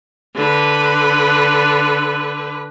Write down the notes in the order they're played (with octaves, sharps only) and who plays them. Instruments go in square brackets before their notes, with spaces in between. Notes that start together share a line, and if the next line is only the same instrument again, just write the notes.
[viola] D3 B4